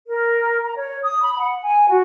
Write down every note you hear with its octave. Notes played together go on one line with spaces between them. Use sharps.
A#4
A#5
C#5
D#6
B5
F#5
G#5
F#4